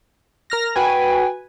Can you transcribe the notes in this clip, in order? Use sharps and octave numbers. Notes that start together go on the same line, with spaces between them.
A#4 F6 A#6
F#4 B4 G5 G#5